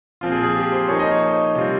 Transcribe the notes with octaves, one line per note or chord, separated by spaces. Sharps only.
A#2 F3 C4 F4
G#4
G#4
G4
C5
F3 A#3 D#4 C#5
D#5
C#5
C3 G3 C4 F4